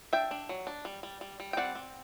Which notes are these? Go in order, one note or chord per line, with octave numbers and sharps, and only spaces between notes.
D4 E5 G5
D4
F#3
D4
G3
G3
G3
G3
G5
C4 D5 F#5
C4